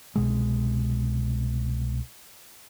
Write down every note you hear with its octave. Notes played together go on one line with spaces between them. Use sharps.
C2 B2 G#3